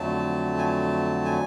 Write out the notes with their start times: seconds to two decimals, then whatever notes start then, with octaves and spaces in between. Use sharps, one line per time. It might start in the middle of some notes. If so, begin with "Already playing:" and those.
Already playing: F2 D3 F#3 A3 A5
0.59 G#5
0.66 A5
1.25 G#5